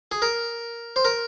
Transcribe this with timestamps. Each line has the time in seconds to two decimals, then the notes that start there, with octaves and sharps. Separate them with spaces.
0.12 G#4
0.22 A#4
0.96 C5
1.05 A#4